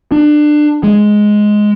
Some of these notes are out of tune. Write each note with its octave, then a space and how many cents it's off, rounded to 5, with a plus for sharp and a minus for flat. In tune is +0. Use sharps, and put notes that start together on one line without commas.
D4 +25
G#3 +5